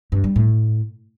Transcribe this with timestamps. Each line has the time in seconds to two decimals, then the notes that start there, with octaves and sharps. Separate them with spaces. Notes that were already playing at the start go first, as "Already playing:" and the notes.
0.12 G2
0.24 G3
0.36 A2